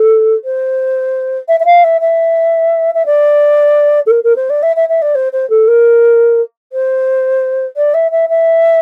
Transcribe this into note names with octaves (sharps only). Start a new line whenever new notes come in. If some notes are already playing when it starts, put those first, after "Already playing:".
Already playing: A4
C5
E5
E5
F5
E5
E5
E5
D5
A4
A#4
A#4
C5
D5
E5
E5
E5
D5
C5
C5
A4
A#4
C5
D5
E5
E5
E5